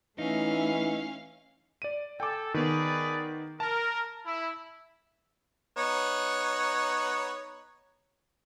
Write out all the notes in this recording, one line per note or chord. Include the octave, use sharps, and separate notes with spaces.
E3 A3 C#4 D#4 E5 F5
D5 D#7
A4 G5 G#5 D6
D#3 B3 G#4 B4 D5
A#4 A5
E4
B3 D#4 C#5